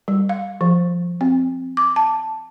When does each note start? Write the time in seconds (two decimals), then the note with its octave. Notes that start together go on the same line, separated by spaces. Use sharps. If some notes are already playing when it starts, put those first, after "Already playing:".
0.08 G3
0.29 F5
0.61 F3
1.21 C4
1.77 D6
1.96 A5